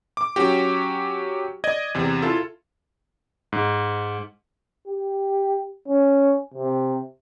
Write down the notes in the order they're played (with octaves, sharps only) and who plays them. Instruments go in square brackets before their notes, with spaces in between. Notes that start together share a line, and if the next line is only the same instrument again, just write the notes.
[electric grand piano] D6
F#3 C#4 F#4 G4
D5 D#5 G#6
E2 C3
E4 F4 A4
G#2
[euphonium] G4
C#4
C3